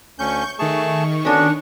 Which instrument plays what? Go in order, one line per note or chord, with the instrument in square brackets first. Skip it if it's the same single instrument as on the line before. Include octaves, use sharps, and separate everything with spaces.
[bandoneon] D2 C#4 [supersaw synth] C#6 G6
[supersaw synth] D#3 C#6 [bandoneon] A3 G#4 A5
[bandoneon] D3 B3 F#4 [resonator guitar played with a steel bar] C#4 D4